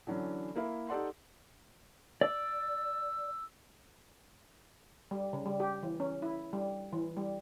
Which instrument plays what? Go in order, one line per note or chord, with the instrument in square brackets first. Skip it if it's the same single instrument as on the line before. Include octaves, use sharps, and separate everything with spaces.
[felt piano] D3 E3 F#3 C#4
A#3 E4 A#4 E5
D#4 G4 A4 D5 F#5 C6
[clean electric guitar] D5 [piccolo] E6
[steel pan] G3
C#3
G3
G4
E3
C#4
E4
G3
E3
G3